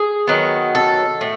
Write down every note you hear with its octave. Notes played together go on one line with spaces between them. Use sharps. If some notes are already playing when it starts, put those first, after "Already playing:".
Already playing: G#4
D#3 F#3 B3
A4
A2